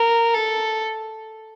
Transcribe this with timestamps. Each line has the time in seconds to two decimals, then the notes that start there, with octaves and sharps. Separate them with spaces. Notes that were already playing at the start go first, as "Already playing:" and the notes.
Already playing: A#4
0.34 A4